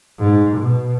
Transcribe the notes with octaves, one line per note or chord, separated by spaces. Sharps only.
G#2
B2